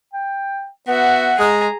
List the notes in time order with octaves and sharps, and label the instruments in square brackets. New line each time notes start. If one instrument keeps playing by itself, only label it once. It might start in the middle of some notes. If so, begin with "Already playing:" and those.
[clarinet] G5
[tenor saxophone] B3 [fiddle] F#4 E5 [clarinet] F#5
[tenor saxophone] G#3 [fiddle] G#4 A#5